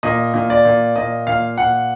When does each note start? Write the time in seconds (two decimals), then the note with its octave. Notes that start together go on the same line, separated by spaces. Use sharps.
0.03 A#2 D#5
0.34 A#2
0.50 D5
0.65 A#2
0.96 A#2 D#5
1.27 A#2 F5
1.58 A#2 F#5